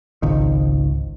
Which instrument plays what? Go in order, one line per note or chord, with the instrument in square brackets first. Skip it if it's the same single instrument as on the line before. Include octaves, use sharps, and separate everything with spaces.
[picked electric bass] G#1 C#2 D#3